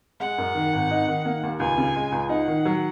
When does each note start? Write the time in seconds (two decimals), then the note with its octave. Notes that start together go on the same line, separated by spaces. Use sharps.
0.20 G#3 F#5
0.38 F#2
0.55 D#3
0.73 G#1
0.91 D#4
1.08 D#3
1.25 A#3
1.43 D#2
1.60 C#2 G#5
1.78 C#3
1.96 G#3
2.12 C#2
2.29 D#4 F#5
2.47 D#3
2.65 F#3